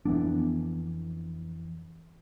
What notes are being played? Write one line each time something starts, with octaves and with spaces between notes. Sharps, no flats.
F2 E3 B3 D4